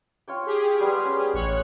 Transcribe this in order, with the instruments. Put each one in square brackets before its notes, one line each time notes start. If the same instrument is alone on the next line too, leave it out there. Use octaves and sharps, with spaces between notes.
[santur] F4 C#5 G5
[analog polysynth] G4 G#4
[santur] G3 B3 C6
C#4
[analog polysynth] A1 C#5 F#6